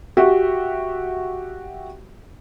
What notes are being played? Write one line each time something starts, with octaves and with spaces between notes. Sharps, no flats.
F#4 G4 E5